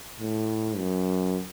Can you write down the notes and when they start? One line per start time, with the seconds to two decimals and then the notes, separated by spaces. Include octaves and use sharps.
0.20 A2
0.77 F#2